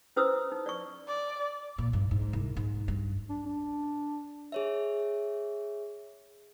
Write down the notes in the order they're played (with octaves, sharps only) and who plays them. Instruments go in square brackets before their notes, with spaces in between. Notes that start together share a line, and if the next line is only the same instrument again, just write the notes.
[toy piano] C#4 E4 B4 C5 D#6 E6
D#4
D5 C#6
[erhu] D5
[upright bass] A#2
G2
G#2
C2
G#2
G2
[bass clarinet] D4
D4
[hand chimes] G#4 C#5 E5